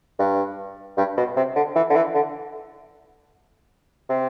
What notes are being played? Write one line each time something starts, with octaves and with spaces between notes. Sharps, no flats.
G2
G2
B2
C3
D3
E3
D3
E3
D3
C3